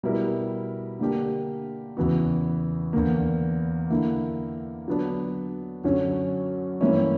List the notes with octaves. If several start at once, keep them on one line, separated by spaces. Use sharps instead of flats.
B2 G3 B3 E4 A#4
D3 A#3 D4 G4 A#4
E2 C#3 E3 B3 F#4
E2 D3 A#3
D3 A#3 E4
D3 F#3 B3 D4
F#2 D3 F#3 C#4
G2 E3 A#3 C#4 E4